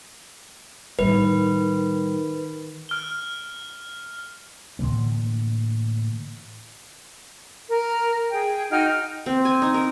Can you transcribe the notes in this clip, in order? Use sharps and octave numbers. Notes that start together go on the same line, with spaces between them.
A2 D#3 G3 B4
F6 G7
A2 D3 E3 A#3
A#4
G#4 G5
D#4 F#4 G5 F6
C4
G#5
D#4
A#4